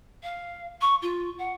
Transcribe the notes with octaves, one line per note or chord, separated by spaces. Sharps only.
F5
C#6
F4
F#5